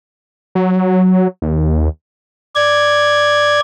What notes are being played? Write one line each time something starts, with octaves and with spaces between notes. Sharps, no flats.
F#3
D#2
D5 G#6